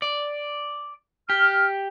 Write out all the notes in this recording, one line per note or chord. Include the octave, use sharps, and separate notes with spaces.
D5
G4 F6